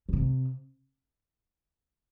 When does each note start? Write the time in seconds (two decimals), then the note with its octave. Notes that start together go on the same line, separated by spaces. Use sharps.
0.09 D3
0.13 C3